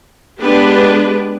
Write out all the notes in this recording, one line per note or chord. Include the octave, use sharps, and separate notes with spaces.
G#3 B3 D4 G4 B4